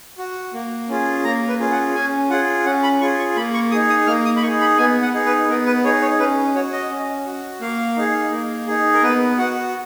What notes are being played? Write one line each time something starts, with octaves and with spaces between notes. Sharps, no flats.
F#4
A#3
C#4 F4 G#4
A#3 A#5
B4
C#4 F4 G#4
F#5
C#4 G#5
F4 G#4 F#5
C#4 F#5
B5
F4 G#4 C#6
C#6
A#3 B5
C#6
D#4 G#4 D#6
D#6
A#3 F6
D#6
B5
D#4 G#4 C#6
B5
B3 G#5
F#5
D#4 G#4
B4
B3 A#4
B4
D#4 G#4 C#5
C#5
C#4 B4
F#4 C#5
D#5
C#4
F#4
A#3 F5
D#4 G#4
A#3
D#4 G#4
A#4
B3 B4
F#4 F#5